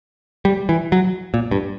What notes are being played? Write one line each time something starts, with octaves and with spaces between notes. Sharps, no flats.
G3
E3
F#3
A#2
G2